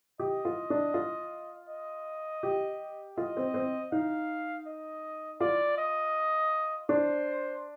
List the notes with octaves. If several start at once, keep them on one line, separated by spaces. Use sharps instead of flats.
G4 D#5
F4
D4
F4
D#5
G4
F4 D#5
C4
C4
D#4 F5
D#5
F4 D5
D#5
D4 C5